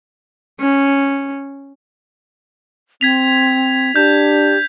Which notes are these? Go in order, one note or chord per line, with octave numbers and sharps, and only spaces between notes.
C#4
C4 G#6 B6 F7
D4 G4 G6